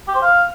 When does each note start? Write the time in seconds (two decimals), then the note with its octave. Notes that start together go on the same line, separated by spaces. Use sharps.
0.08 G4
0.15 C5
0.22 F5